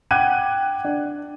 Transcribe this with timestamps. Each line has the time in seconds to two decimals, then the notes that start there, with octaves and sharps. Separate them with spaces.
0.11 F#5 G5 D6 F#6 G#6 D#7
0.85 D4